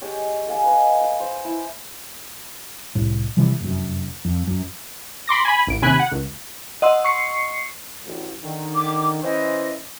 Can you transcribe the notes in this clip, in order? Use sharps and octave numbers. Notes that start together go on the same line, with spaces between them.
G#3 G4 C#5
A4 F5 G#5
B4 D#5
D6
C5
E4
C2 A2
C3 E3 F3 G3
F1 F#2
F2
F#2
B5 C6 D6 A#6
G#5 B5
A1 D7
D#2 C3 G#5 B5 F#6
F#5
C#2
D#5 F#5 C6 E6
C#6 C7 C#7
A1 D2
D3 D#3
D6
E3 C#4 C5 D#5